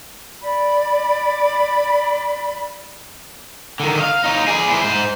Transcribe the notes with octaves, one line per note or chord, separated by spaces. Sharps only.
D5 B5
D3 D#3
D#5 F5
D#4 C#5
G#4 D5
E4 C5
G#2 C5